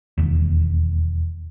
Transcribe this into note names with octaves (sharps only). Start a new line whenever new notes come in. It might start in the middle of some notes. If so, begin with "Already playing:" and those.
E1 D#2